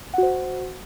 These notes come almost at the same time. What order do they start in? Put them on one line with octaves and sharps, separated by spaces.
F#5 F#4 C5